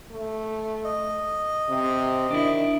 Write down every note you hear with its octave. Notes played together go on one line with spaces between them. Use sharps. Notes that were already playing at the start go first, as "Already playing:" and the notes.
A3
D#5
C3
D#3 D4 E4